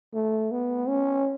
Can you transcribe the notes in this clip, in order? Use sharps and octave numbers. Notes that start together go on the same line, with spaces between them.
A3
B3
C#4